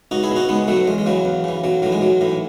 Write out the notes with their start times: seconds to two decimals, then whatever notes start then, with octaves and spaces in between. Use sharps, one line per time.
0.11 C#2 D#4 F#4
0.23 E4 G#4
0.31 B2
0.36 D#4 F#4
0.49 C#2 G#3 B3
0.68 B2 F#3 A3
0.87 E2 G#3
0.98 G#3
1.06 C#3 E3 F#3
1.25 E2
1.44 C#3 E3
1.64 B1 F#3
1.82 A2 E3 F#3
1.92 G#3
2.01 B1 F#3
2.21 A2 E3